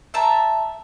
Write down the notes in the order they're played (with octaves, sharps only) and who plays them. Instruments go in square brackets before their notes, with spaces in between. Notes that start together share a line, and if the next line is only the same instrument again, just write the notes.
[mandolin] E5 A5 A#5